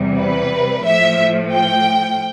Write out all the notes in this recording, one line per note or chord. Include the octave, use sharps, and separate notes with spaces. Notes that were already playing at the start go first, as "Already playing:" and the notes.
Already playing: E2 C3 G3
B4
A2 F3 E5
G5